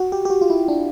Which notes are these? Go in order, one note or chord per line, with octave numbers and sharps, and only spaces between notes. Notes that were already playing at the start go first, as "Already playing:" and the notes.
Already playing: F#4
G4
G4
F#4
F4
E4
D4